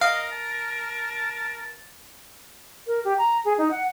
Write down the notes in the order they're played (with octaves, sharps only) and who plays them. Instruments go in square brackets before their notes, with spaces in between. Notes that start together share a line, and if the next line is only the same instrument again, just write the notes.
[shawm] A#4 [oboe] D#5 [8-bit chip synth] F5
[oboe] A5
[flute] A#4
G4
A#5
G#4
D#4
F#5